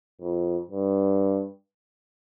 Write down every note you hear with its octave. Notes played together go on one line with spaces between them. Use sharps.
F2
G2